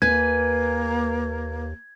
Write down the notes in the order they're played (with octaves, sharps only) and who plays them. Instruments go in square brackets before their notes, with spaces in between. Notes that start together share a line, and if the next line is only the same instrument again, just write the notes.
[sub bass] D#2 [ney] A#3 [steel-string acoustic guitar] B4 G#5 [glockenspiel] G#6